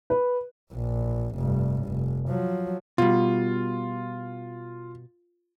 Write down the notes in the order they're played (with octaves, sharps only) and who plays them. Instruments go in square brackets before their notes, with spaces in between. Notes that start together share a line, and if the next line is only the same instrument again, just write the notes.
[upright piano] B4
[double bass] A#1
F1 G2
F1
F3 F#3
[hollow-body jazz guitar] B2 G3 [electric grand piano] F4